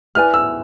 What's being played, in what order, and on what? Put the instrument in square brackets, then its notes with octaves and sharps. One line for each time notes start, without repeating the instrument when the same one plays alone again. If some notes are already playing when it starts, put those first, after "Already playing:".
[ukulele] E4 B4 D5 G#5 [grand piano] F6
[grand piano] E6